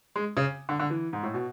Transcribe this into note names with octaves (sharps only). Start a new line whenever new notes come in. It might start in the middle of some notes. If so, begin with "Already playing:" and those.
G#3
C#3
D3
D3
E3
G#2
A2
B2